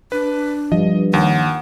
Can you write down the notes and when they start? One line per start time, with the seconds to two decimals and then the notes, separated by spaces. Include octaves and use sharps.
0.12 D4 B4
0.72 G2 F3 D#5
1.13 D#2 F#5